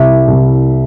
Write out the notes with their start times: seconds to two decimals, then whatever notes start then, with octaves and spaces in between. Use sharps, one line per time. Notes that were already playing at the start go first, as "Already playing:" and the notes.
Already playing: C2 E4 E5
0.28 C2